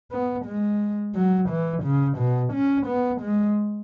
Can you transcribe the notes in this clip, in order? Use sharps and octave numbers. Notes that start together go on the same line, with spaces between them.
B3
G#3
F#3
E3
C#3
B2
C#4
B3
G#3